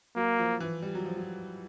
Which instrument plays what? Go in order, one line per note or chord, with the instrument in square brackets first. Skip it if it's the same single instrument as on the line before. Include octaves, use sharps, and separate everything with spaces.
[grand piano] F#3 [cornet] A#3
[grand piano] F3
E3
G3
F#3
F3
F#3